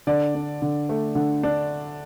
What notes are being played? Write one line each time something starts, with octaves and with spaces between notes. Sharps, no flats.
D3 D5
D4
D3
A3
D3
D4